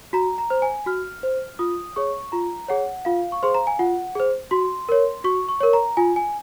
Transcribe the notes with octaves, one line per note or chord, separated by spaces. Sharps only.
F#4 A#5
A#5
C5
G#5
F#4 F6
C5
F4 D#6
G#4 C#5 C#6
F4 A#5
G#4 C#5 F#5
F4 F5
C#6
G#4 C5 C6
A#5
G#5
F4 F#5
G#4 C5
F#4 C6
A#4 C#5
F#4 C#6
C#6
A#4 C#5
A#5
F4 G#5
G#5